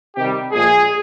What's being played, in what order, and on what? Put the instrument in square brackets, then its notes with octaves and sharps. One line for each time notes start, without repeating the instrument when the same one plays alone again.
[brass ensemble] C3 D#3 G3 G4
A#2 F3 G#3 G#4